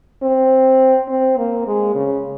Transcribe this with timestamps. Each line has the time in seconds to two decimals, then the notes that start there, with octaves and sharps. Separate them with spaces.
0.23 C4
1.08 C4
1.37 A#3
1.67 G#3
1.95 C#3